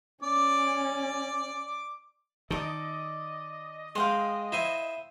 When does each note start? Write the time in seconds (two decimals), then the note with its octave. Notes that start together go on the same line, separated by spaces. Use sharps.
0.23 C#4 D5 D6
2.51 D#3 A4 D5 D#5
3.95 G#3 F5 G5 C6
4.52 E4 C5 G#5